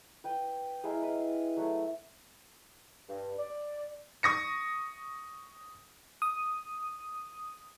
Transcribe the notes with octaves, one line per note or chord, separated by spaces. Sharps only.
B4 G5
G#3 E4 A#4 F5
B4
F#3 A3 F#4
G2
D5
C#6 D#6 A#6 C#7
D#6